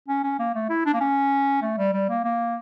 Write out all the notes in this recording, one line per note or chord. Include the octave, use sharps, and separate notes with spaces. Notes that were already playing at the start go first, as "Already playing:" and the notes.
C#4
C#4
A#3
A3
E4
D4
A#3
C#4
A3
G3
G3
A#3
A#3